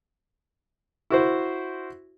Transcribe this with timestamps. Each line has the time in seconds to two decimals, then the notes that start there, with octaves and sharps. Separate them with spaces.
1.10 E4 F#4 C5